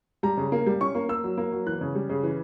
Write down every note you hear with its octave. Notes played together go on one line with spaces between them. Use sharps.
G3 A#5
C#3
A#3
G3
C#4 C#6
A#3
A#3 E6
F#3
A#3
F#3
E3 F#6
C#3
G3
C#3
E3